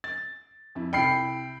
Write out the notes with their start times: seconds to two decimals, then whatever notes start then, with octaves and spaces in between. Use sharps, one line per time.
0.04 A6
0.75 F2 E4
0.93 C2 E4 G5 B5 C7 C#7